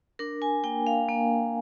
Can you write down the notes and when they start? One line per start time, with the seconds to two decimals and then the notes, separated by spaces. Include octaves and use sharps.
0.19 D4 A#4
0.42 G#5
0.64 A#3 G5
0.87 F5
1.09 A#3